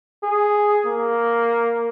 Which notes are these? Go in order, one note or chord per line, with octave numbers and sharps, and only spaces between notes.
G#4
A#3